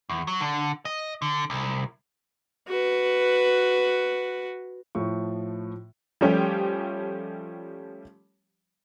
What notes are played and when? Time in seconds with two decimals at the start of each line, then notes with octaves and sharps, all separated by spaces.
0.09 E2
0.27 F#3
0.41 D3
0.85 D#5
1.22 D3
1.50 C2
2.68 F#4 B4
4.95 A2 F3 C#6
6.21 F3 G3 A3 C#4 G4